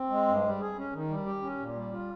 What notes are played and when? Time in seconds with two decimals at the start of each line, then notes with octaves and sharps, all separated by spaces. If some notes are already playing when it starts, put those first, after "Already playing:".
Already playing: C4
0.10 G#3
0.27 G2
0.44 G3
0.60 G#4
0.77 C#4
0.93 D#3
1.09 G3
1.26 G4
1.42 C#4
1.58 A#2
1.75 G3
1.92 F4